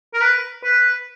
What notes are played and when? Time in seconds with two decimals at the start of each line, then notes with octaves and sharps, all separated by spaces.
0.14 A#4
0.21 B4
0.64 B4